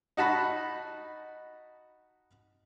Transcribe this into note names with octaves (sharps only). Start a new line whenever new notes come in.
D#4 F#4 A5 B5